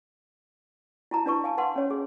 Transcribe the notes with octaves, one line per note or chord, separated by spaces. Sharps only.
E4 A5 A#5
D4 E4 B4 A5 C#6
F5 G#5 A5
B4 F5 F#5 A5 C6
C#4 C#5
G#4